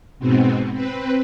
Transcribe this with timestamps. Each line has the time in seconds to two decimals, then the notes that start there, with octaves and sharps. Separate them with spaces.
0.19 G#2 B2 B3 C4
0.73 C4 B4